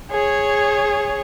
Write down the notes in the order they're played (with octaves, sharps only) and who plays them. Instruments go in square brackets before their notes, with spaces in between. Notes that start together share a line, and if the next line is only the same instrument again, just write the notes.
[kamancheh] G#4 C#5